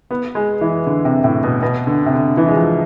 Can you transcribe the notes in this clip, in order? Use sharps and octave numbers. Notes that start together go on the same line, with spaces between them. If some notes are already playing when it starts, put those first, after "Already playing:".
B3
G#3
E3
D3
C3
A2
B2
B2
D3
C3
D3
E3
G#3
F3